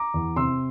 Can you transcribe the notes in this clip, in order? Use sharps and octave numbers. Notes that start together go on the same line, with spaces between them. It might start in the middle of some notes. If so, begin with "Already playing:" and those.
Already playing: A#5 D6
E2
C3 C6 E6